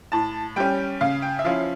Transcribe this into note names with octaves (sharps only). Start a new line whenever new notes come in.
A2 A5
G3 C#4 G5
C#3 F5
G5
E5
F3 C#4 E4 F5